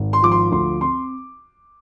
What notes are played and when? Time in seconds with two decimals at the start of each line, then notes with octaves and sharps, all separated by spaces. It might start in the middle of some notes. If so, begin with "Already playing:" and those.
Already playing: G#1
0.13 C6
0.22 F3 D6
0.32 C6
0.51 D2 C6
0.81 C4 C6